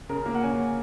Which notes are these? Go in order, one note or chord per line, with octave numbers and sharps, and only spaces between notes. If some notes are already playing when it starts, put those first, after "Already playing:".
C#3 A#4
A#3
F#5
C#4 G#5